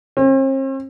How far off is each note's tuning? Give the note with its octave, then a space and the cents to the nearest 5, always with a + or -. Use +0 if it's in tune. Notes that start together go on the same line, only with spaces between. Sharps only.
C4 +45